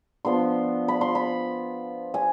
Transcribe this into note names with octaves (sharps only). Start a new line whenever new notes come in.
F3 B3 D4 C6
B5
C6
B5
G#5